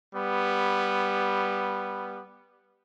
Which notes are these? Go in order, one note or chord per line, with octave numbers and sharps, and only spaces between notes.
G3 B3